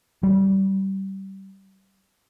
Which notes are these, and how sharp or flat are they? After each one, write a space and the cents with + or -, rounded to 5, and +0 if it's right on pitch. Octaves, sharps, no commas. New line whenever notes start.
G3 -25